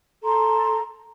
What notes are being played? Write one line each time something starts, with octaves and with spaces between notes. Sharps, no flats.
A4 A#5 C6